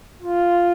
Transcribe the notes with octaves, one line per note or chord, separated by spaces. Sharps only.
F4